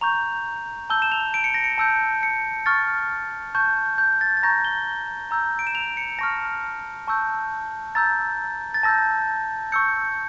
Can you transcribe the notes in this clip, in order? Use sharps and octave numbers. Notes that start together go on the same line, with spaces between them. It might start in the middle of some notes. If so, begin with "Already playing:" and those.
A#5 C#6 G6 F7
A5 E6 G6 G7
E7
F7
D7
C#7
A#6
C#7
A5 E6 G6
C#7
C#6 F6 A6
A5 C#6 G6
G6
A6
A6
A#5 C#6 G6 A#6
G7
A#5 E6 G6
D7
E7
F7
C#7
A5 C#6 F6 A#6
A5 C#6 E6 G6
A#5 E6 G6 A6
A6
A5 E6 G6 A#6
C#6 E6 G6 C#7